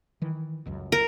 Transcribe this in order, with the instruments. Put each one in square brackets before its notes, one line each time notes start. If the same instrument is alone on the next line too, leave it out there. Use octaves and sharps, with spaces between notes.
[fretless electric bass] D#3 E3
D#1 C#2 F#2
[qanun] A#4